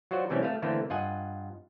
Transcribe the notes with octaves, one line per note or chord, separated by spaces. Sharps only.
F#3 F4 F#4 C5 D5
C3 E3 G3 A3 C4 C#4
A3 F5
D3 E3 A3 A#3 C4
G2 F4 D#5 F#5 G#5